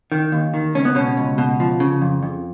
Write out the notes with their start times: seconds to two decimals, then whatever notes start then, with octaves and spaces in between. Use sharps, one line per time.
0.12 D#3
0.32 D#2
0.54 D#3
0.75 C#2 C#4
0.85 B3
0.95 B2 C#4
1.17 C#2
1.38 B2
1.60 F3
1.80 C#3
2.01 F2
2.23 F2